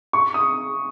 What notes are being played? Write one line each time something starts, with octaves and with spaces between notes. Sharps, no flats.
C#6
D#6